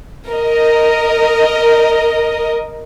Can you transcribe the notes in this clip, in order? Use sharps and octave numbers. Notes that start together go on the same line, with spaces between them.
A#4 D#5